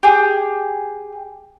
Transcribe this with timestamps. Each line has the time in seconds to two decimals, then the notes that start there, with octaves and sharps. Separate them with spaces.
0.03 G4 G#4